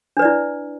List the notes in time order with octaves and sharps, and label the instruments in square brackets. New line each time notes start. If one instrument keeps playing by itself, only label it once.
[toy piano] D4
B4
D5
E4